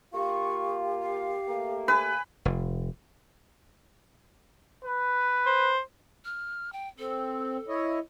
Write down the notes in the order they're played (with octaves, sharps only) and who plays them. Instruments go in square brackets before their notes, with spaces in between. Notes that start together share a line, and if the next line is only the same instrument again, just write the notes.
[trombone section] A#3 F4 [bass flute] G4 [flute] C#6
[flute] F5
[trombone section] A3 A#3
[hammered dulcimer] B4 [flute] G#5
[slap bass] F1
[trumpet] B4
[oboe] C5
[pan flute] F6
G5
[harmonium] C4 [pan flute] A4
[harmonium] E4 C#5 D#5